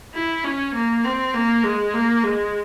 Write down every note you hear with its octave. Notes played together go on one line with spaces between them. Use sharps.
E4
C#4
A#3
C4
A#3
G#3
A#3
G#3